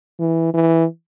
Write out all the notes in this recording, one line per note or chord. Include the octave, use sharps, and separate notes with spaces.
E3
E3